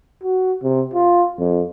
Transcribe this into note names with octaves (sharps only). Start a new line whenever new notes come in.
F#4
C3
F4
F2